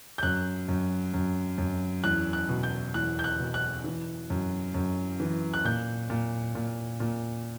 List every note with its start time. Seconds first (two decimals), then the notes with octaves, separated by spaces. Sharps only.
0.18 G6
0.23 F#2 F#6
0.68 F#2
1.14 F#2
1.58 F#2
2.04 E2 F#6
2.33 F#6
2.49 B2
2.63 G6
2.94 E2 F#6
3.19 G6
3.24 F#6
3.39 B2
3.54 F#6
3.84 E3
4.30 F#2
4.74 F#2
5.20 E3
5.54 F#6
5.64 A#2 G6
6.10 A#2
6.55 A#2
7.00 A#2